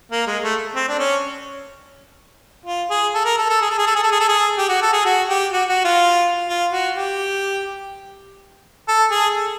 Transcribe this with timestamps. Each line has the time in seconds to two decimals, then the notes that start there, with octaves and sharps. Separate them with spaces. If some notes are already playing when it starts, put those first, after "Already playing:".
0.12 A#3
0.27 G#3
0.43 A3
0.75 C4
0.88 D4
0.99 C#4
2.66 F4
2.90 G#4
3.15 A4
3.25 A#4
3.38 A4
3.50 A4
3.62 G#4
3.71 A4
3.79 G#4
3.87 A4
3.96 G#4
4.03 A4
4.12 G#4
4.20 A4
4.29 G#4
4.58 G4
4.69 F#4
4.82 A4
4.93 G#4
5.06 F#4
5.29 G4
5.53 F#4
5.69 F#4
5.85 F4
6.49 F4
6.73 F#4
6.96 G4
8.88 A4
9.11 G#4
9.36 A4